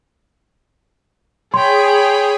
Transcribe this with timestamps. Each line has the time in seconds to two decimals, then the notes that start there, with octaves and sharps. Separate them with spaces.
1.54 G#4 C#5 G5 B5 C6